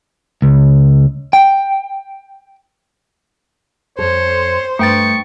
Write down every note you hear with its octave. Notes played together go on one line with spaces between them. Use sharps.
C#2
G5
F2 A4 C5 C#5
G2 A3 G5 C#6 A6